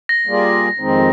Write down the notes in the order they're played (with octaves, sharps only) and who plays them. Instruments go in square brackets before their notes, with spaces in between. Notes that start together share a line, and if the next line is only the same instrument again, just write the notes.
[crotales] A#6
[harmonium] G3 A#3 F4 G#4 D5
F2 D#3 G#3 C4 D#4